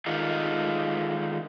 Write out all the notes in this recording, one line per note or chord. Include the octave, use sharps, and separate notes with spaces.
D3 D#3 G#3 D#4 F4